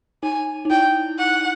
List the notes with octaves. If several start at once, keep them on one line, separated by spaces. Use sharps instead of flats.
D#4 G#5
D#4
E4 G5
F#5